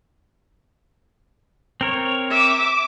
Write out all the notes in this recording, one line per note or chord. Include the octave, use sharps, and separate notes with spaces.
C4 A#4 C#5
E5 D6